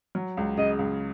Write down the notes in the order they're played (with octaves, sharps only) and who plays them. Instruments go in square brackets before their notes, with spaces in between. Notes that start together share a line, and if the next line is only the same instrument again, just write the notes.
[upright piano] F#3
C#2
[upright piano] C#3 [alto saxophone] D#5
[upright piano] C#2